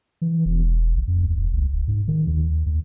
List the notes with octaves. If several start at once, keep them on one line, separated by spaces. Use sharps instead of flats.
E3
E1
A#1
F2
D#2
D#1
C#2
D1
G#2
D#3
D#2
D#2